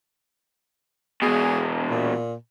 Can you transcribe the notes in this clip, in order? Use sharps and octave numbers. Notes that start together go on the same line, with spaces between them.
E2 B2 G#4
A#2